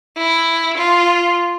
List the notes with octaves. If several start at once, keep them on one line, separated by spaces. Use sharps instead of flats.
E4
F4